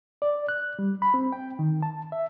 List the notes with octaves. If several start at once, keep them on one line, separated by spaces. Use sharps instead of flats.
D5
F#6
G3
B5
C4
G5
D#3
A5
E5